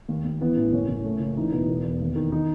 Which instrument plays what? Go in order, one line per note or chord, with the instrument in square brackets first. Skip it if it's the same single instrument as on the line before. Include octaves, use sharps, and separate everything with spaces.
[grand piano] D#2
D#2
E3 B3
A1
F#1 C#4
F#1
A3
C#2
E3 D#4
E1 B3
E1
E2
D#2
D#3
D#3 D#4